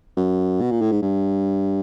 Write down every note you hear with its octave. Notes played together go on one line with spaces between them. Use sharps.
F#2
B2
A#2
A2
G#2
G2